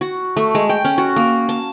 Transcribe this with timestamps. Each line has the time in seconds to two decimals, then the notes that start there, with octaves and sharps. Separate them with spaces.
0.01 F#4
0.36 A3
0.55 G#3
0.69 G5
0.85 C#4
0.98 F#4
1.16 A#3
1.49 A5